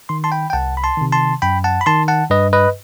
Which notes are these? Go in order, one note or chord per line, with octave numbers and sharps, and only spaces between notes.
D#3 C6
A5 C6
G5 B5
G5
C2 F#5 A5
B5
A5 C6
C3 D#3
A5 C6
F#2 G5 B5
F#5 A5
B5
D#3 A5 C6
F#5 A5
G2 B4 D#5
B4 D#5